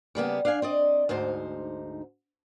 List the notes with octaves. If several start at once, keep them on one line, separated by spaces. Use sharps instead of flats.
C#3 G3 A#3 B3
D4 F5 G#5
C4 D5 D#5
D2 G#2 D#4 C5